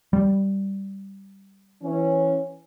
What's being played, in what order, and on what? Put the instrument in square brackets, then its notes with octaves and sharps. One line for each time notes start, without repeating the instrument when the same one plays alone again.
[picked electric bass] G3
[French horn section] E3 C#4